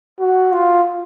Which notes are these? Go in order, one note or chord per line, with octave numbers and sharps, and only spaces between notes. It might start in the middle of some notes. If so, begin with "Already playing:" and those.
F#4
F4